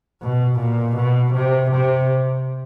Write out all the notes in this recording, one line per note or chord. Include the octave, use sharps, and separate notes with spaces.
B2
A#2
B2
C3
C3